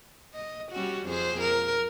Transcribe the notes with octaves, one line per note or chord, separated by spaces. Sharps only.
D#5
G3 C#4 F#4
F2 G#4 C5
A#4